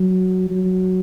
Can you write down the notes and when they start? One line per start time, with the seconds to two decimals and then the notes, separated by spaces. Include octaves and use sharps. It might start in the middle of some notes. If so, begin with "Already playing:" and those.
Already playing: F#3
0.50 F#3